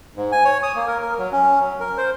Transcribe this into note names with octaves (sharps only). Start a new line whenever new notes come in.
G#2
G#5
C#5
D#6
A#3
A#4
A#4
F#3
C#4
F#3
A#4
C5